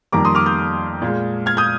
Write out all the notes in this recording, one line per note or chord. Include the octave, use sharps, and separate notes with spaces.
F2 D#3 G3 A#3 A#5 D6
C6 D#6
D6 F6
D#6 G6
A#2 G#3
F6 G#6
D#6 G6